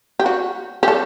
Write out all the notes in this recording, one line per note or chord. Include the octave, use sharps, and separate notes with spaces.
G4
F#4
G4
A4